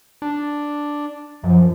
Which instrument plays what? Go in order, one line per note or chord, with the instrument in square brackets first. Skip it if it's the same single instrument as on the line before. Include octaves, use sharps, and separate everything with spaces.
[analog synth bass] D4
[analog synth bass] F#2 [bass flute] F3